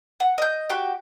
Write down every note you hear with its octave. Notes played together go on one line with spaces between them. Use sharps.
F#5
D#5 G6
F#4 G4 G5